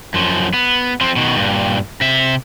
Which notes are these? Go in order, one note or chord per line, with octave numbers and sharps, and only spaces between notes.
F#2 F3
B3
F3 C4
B2 D#3
G2 A#2
C3 E5